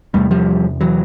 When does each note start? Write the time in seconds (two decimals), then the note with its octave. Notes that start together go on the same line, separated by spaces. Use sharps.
0.14 E2 C3 G3 A3
0.31 F3 G3
0.81 E3 F#3